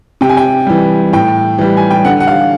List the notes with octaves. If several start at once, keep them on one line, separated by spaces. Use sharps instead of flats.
C3 G5
G#5
G5
E3 G3
A2 G5
E3 G3
G#5
G5
D3 F#5
F#5
F5